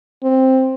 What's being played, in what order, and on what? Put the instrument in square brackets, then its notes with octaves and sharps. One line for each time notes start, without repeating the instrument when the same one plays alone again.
[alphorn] C4